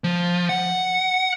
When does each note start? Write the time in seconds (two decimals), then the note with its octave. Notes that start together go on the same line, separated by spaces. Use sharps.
0.04 F3
0.49 F#5